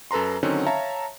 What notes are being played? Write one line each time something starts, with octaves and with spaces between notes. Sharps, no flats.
F#2 A4 B4 A#5 C6
D3 D#3 F#3 C4 C#4 D#4
C#5 E5 F5 A5 A#5